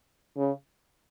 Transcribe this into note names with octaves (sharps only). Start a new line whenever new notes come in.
C#3